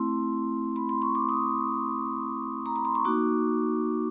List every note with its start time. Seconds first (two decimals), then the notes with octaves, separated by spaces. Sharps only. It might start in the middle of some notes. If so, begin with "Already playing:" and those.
Already playing: A3 C4 E4 C6
0.76 B5
0.89 C6
1.02 C#6
1.15 D6
1.29 D#6
2.66 A#5
2.76 B5
2.85 C6
2.95 C#6
3.05 A#3 D#4 F#4 D6